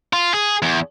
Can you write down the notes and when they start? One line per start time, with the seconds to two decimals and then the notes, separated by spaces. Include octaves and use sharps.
0.13 F4
0.34 G#4
0.62 E2